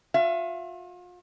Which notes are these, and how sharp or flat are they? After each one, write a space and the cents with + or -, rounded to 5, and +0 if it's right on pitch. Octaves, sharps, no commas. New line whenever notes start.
F4 +40 E5 +30